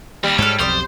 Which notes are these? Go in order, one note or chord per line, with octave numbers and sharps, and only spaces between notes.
D#2 G3
G#2 G#3 A4 C#5 F6
B1 F2 C5 D5 D#6 F6